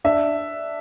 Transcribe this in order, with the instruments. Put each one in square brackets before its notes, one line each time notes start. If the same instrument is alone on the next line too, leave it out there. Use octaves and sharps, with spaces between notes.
[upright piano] D4 E5